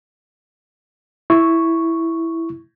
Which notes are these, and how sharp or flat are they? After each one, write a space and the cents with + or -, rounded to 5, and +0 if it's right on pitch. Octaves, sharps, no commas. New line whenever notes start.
E4 +0 C#6 +0